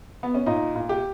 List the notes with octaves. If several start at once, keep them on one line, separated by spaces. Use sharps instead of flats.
B3
C#4
A#2 D#4
A#2
G4